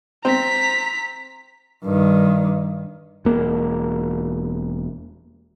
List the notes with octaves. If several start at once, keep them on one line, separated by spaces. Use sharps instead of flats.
C4 A#5 B6
G2 D#3
E1 A#3